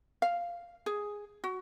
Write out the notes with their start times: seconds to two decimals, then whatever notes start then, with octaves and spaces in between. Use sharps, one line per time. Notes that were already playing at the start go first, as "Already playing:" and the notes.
0.22 F5
0.86 G#4
1.44 F#4